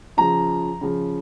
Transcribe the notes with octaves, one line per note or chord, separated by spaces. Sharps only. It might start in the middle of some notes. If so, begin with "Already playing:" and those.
C#3 F3 A#5
C#3 F3